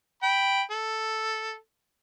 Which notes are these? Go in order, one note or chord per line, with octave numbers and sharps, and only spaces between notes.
G5 B5
A4